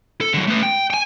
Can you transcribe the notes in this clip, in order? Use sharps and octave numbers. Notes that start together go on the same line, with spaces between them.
A4
D3 F#3
A3 B4
G5
G5 G#5